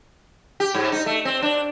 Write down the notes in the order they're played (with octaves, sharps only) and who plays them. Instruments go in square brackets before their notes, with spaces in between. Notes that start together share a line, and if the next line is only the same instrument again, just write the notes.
[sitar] G4
G#2
D#4
A3
C4
D4